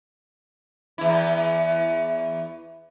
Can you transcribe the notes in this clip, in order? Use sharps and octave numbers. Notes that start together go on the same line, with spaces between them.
E2 E4